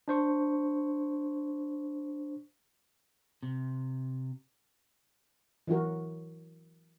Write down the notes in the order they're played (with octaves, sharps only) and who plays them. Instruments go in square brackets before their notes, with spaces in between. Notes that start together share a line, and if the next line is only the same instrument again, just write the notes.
[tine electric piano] D4 C5 C#6
[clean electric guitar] C3
[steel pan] E3 F#3 E4 F#4 A#4